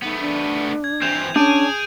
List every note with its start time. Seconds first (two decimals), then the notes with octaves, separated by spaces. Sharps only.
0.02 A3 B3 D#4
0.19 D4
0.84 G#6
1.02 E3 C4 G6 E7 F7
1.36 C#4 D4 G#4 G6 D7 D#7